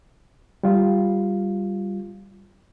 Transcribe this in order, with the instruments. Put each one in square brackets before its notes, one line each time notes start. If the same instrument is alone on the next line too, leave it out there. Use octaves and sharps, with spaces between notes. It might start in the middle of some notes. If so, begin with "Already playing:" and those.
[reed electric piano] G3 F4